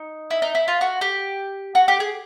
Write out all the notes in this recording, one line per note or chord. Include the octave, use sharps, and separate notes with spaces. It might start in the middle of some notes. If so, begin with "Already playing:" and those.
Already playing: D#4
E4
D#4
E4
F4
F#4
G4
F#4
G4
G#4